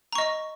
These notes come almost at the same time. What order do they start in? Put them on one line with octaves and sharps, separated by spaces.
A#5 C#6 D#5